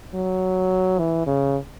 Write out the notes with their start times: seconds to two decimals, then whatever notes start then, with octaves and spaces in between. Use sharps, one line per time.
0.15 F#3
0.99 E3
1.27 C#3